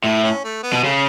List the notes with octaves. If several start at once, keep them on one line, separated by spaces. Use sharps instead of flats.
A2 E4
C#4
A3
B3
B2
C#3 A3 C#4